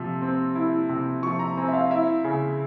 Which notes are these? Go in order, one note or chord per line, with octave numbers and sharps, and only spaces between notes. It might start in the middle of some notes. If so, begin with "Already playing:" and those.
Already playing: C3 F3 E6
C4
E4
C3
F3 C#6
A#5
C4 G#5
E5
F5
E4 E5
C#3